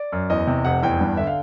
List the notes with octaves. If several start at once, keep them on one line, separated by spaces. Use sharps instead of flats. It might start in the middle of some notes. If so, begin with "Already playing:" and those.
Already playing: D5
F#2
E2 D#5
C3
F1 F#5
E2 G5
G2
D3 E5
F5